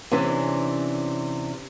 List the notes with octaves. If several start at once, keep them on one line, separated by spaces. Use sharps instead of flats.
C3 E3 C#4 D4